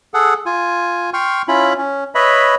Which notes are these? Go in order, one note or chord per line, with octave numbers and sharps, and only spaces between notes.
G#4 A4 F#5
F4 G#5
G5 C6 C#6 F6
C#4 E4 F4 B5
C#4
B4 C#5 D#5 E5 B5